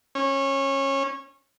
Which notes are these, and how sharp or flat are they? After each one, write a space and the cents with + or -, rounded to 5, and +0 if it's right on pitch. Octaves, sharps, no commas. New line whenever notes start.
C#4 -20